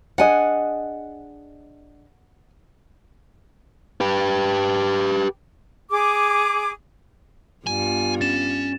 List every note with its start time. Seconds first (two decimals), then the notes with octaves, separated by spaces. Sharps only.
0.18 D4 G#4 D#5 F#5 G#5
4.01 G4 B4
5.91 G#4 D6
7.67 G2 B3 F4 G#5
8.21 C#4 A6 E7